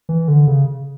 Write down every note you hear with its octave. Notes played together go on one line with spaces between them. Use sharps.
E3
D3
C#3